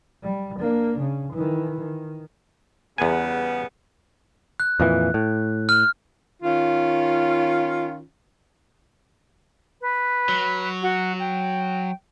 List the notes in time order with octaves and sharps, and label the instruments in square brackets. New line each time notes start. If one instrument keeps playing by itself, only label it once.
[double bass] G3
A#3 D4
C#3
D#3 E3
D#3
[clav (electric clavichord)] E2 G#5 [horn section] C#3 G3 B3
[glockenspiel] F#6
[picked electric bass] F2 A#2 E3
A2
[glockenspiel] F6
[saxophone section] D#3 C#4 F4
[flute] B4
[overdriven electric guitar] F#3
[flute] F#4
G5